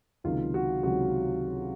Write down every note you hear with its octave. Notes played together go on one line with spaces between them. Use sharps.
C#2 C3 D#3 F#3 F4
F#4
C#2 C3 D#3 F#3 F#4